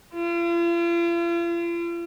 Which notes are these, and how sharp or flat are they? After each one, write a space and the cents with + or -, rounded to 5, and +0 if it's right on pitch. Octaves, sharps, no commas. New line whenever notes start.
F4 -45